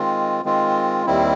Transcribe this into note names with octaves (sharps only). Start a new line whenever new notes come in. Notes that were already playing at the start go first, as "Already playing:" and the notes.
Already playing: D#3 G#3 C4 F4
D#3 G#3 C4 F4
D#2 D#3 G3 C4 E4